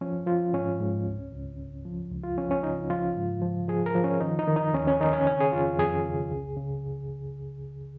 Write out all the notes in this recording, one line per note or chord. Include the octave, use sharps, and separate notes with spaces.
F3 C#4
F3 F4
G#2 C#4
G#2
C#2
C#2
C#3
F3
C#2
F4
F3 C#4
C#4
C#3 D#4
F3 F4
G#2
F3
F3 G#4
A#4
F3
C#4
D#3 D#4
D#4
D#3
D#4
D#2 C#4
C#4
D#3 D#4
C#4
C#3 C#4
G#4
F2 F4
F2 G#4
C#3
C#2
C#3